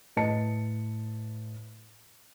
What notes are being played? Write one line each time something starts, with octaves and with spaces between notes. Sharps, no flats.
A2 B4 D#5 A5 C#7